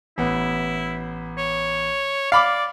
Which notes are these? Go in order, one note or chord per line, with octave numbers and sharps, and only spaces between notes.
A1 B3 E4
C#5
D5 F5 B5 D6